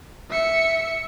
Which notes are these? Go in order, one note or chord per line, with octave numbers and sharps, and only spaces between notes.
E5 C#7